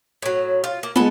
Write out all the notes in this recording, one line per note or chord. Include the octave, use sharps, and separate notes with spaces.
A2 F#3
F4
A#3
G#3 B3 A4 G#5 A5